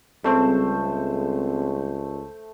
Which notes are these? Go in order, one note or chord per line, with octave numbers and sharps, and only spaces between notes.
C#2 G3 A3 C4 G#4 C5